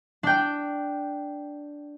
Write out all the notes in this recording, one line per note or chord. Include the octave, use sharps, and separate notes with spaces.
D4 G5